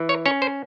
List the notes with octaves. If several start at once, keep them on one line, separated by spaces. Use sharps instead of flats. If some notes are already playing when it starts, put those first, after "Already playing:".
Already playing: E3
C#5
C#4 C#5
C5